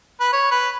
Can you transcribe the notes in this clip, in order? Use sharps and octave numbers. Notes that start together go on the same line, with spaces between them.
B4
C#5
B4